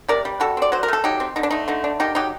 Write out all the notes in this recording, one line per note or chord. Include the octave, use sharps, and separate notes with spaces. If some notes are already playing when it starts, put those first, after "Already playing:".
C3 A#4 D5
G3
C3 F#4 A4
C4 D5
F#3 C5
A#4
A3 A4
F#3 D#4 G4
C4
D3 D#4
D4
A3 D#4
D3 D#4
D4
D#3 D#4 G4
F#3 D#4 G4